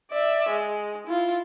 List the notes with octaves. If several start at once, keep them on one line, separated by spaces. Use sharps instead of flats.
D5 E5
G#3
E4 F4